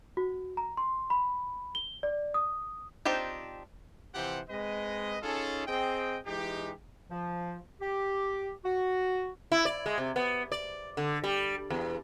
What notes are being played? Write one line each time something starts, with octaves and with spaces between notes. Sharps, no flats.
F#4
A#5
C6
B5
G7
D5
D#6
C4 D4 D#4 F4 G4
C3 E3 F3 G4 C5 F#5
G#3 C4 B4 D#5
C#4 D#4 F4 G#4 A4
C4 G#4 D#5 G5
E3 G#3 D#4 G4
F3
G4
F#4
E4
D5
G#3
C3
B3
D5
D3
G3
E2